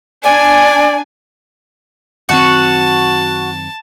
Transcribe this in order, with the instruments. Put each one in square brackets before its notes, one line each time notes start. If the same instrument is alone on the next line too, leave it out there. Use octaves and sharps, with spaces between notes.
[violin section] D4 G#5 [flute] D5
[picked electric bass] F#2 D#3 C4 [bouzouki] F#4 [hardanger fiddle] A5